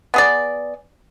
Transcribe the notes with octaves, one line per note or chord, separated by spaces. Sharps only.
B3 G#4 D5